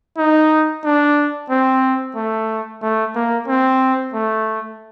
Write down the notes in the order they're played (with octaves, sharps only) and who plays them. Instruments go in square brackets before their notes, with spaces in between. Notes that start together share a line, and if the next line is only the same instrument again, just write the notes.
[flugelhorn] D#4
D4
C4
A3
A3
A#3
C4
A3